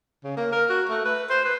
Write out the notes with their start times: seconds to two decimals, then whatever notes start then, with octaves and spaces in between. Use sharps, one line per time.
0.24 C#3
0.37 A#3
0.52 A#4
0.69 F#4
0.89 A3
1.05 B4
1.30 C5
1.45 B4